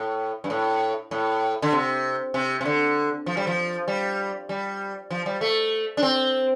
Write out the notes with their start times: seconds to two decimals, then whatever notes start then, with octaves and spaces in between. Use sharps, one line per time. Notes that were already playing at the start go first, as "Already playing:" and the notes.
Already playing: A2
0.44 G2
0.50 A2
1.11 A2
1.62 D3
1.73 C3
2.34 C3
2.61 C3
2.65 D3
3.26 F3
3.37 G3
3.47 F3
3.88 G3
4.49 G3
5.10 F3
5.26 G3
5.41 A3
5.97 D4
6.03 C4